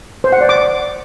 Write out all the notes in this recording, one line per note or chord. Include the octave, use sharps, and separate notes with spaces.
C5
F#5
D5
D6